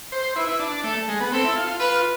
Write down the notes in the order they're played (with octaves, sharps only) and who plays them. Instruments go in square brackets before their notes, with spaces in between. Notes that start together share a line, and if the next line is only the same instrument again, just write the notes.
[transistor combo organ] C5
[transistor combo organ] E4 [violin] B4
[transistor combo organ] E4
D4
[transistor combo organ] A3 [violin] A4
[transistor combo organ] G#3
B3
[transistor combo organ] C4 [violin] A4
[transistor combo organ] E4
F4
F4
[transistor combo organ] F4 [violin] B4